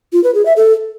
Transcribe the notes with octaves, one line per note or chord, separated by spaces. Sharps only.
F4
B4
G#4
E5
A4